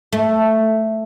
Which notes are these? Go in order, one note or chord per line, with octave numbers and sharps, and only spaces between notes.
A3